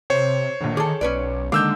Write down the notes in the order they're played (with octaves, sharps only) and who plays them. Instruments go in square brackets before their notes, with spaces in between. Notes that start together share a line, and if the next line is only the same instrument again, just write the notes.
[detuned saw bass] C3 [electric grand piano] C5 C#5
[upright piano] A#1 D3 [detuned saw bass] D#3
[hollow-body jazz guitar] G#4 A4 [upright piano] D6
[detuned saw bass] B1 [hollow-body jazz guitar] C#4 B4 D5
[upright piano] D3 D#3 A#3 [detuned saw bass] G#3 [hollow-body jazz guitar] F5 [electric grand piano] D6 E6 G6